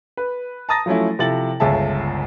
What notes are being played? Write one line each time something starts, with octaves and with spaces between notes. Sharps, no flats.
B4
A5 A#5 D#6 A6 A#6
F3 F#3 A3 C#4 E4
C3 F3 E4 A4 A6 F#7
G1 C#2 G#4 C#5 E5 A5